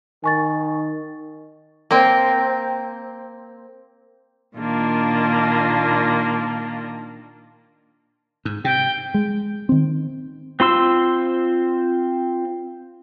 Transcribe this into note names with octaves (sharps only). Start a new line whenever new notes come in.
D#3 G#5 C#6 A6
A#3 C4
A#2 D#3 A#3 D4 F4
G#2
C3 G5
G#3
D#3 C4
C4 F4 C6 E6